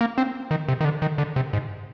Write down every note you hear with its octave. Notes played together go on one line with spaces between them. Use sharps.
A#3
C4
D#3
C3
D#3
D3
D#3
D3
C3
G#2